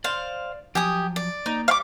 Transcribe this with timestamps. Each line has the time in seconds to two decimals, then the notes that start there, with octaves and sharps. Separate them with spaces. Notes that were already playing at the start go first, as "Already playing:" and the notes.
0.04 C5 D5 F5 C6
0.75 F3 F#3 G4 G#5 D#6
1.16 D5
1.46 A#3 D#4
1.68 G3 F5 D6